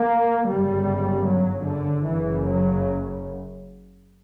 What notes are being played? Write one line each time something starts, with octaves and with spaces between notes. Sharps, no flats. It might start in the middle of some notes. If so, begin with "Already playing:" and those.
Already playing: A#3
G1 F#2 C#3 G3
F#3
D3
F#1 F#2 C#3 E3
F#3